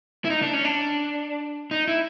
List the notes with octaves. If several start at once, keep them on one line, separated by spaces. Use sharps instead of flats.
E4
D#4
D4
C#4
D4
D#4
E4